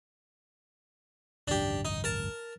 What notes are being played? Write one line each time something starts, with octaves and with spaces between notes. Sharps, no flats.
G#1 C#2 F#2 D4 G4
D#4
A#4 A5